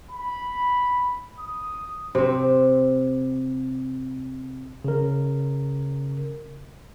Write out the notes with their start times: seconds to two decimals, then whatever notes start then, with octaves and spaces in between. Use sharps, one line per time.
0.11 B5
1.38 D#6
2.15 C3 C4
4.84 C#3 A#4